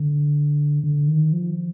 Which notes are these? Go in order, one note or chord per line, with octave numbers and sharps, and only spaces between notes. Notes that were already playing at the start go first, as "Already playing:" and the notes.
Already playing: D3
D3
D#3
F3